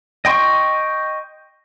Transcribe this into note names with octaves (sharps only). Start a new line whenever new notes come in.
D#5 G5 C6 C#6